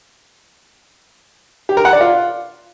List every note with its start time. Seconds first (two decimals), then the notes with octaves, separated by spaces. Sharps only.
1.69 G4
1.77 A#4
1.85 F#5
1.93 D5
2.01 F4